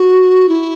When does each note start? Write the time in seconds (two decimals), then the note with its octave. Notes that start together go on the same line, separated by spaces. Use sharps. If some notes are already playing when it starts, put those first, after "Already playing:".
Already playing: F#4
0.49 E4